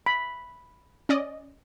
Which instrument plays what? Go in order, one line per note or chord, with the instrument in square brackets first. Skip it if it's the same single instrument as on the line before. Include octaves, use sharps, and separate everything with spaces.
[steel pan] B5
[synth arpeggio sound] C#4 D5 D#5